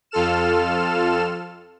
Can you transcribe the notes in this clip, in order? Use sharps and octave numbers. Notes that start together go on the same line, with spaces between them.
F2 F4 A4 F6 E7